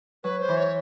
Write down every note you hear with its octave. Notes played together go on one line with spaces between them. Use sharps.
F#3 B4
C5
E3
C#5